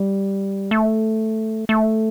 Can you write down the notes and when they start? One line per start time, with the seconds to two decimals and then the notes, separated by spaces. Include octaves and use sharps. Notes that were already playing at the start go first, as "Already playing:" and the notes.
Already playing: G3
0.71 A3
1.69 A3